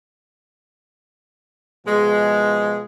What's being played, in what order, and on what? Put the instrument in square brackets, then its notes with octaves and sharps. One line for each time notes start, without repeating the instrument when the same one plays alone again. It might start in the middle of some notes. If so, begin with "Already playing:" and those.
[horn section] B2 F3 G#3